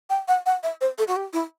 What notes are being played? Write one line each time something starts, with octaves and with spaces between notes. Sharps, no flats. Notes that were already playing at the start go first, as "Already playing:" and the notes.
G5
F#5
F#5
E5
C5
A4
F#4
G4
E4